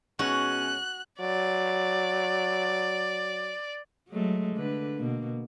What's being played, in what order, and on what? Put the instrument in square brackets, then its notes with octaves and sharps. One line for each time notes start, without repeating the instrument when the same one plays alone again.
[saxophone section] B2 G#3 C#4 [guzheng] F#4 [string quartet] F#6
[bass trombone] F#3 [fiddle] D5
[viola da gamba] F#3 G#3 A3
D3 B4
B2 A#3